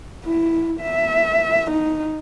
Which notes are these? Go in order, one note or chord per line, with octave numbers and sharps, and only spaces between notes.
E4
E5
D#4